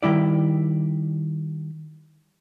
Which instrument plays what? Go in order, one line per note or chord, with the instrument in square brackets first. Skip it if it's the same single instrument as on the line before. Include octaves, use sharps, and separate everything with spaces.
[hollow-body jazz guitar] D#3 G3 E4 D5